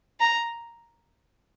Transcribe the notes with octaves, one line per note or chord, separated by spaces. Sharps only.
A#5